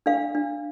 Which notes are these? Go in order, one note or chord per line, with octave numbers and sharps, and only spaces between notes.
D4 F5
D4